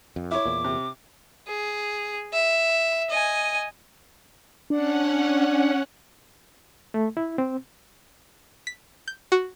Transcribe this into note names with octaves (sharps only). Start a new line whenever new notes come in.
F2
E4 C#5 D6
E2 A#2
C3
G#4
E5
D#5 G#5
C#4 D4 F#5
A3
E4
C4
B6
G6
F#4